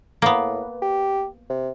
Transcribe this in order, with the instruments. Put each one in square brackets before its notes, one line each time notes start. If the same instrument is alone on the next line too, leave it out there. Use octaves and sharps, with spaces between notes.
[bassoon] A2 [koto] A#3 B3
[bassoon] G4
C3